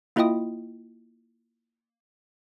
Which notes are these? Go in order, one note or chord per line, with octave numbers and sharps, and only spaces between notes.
A#3 E4 F4 D#5 G5 D#6